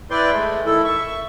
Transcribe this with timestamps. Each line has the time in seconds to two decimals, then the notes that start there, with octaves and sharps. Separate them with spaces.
0.11 E4 B4 D5 G5 C6
0.31 G#3 A3
0.66 D#3 A3 E4 A4
0.84 E5 C#6